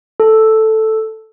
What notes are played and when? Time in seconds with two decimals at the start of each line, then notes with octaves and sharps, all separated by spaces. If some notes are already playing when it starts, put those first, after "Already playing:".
0.20 A4